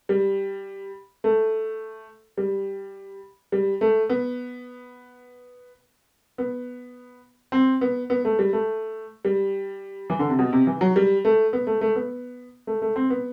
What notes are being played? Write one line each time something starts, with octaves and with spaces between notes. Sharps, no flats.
G3
A3
G3
G3
A3
B3
B3
C4
B3
B3
A3
G3
A3
G3
E3
D3
C3
B2
C3
E3
F#3
G3
A3
B3
A3
A3
B3
A3
A3
C4
B3